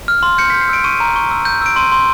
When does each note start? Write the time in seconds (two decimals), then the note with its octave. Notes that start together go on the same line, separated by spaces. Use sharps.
0.08 F6
0.23 C6
0.38 G6 C#7
0.50 B6
0.54 G6
0.61 C7
0.69 E6 D7
0.84 C#6 D#7
1.00 A#5
1.16 C#6
1.31 E6
1.45 G6
1.61 E6 D7
1.76 C6 D#7
1.92 C6